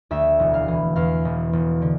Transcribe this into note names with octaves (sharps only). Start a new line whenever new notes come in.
D2 E5
E1
F5
E3
E2 F5
E1
E1
D3